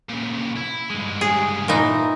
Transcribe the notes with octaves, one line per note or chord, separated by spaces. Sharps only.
A#2 C#3
E4
G2 G#3
G#4
A#2 E3 D#4